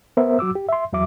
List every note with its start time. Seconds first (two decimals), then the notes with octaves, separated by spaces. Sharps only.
0.17 B3 A#4 C5 E5
0.39 F#3 F#4 D6 E6
0.55 G4
0.69 E5 C6
0.93 E2 F#3 E5 D6